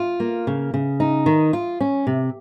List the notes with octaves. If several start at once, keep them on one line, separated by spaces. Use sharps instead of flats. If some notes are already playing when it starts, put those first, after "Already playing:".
Already playing: F4
A#3
C#3
C#3
D#4
D#3
F4
C#4
C3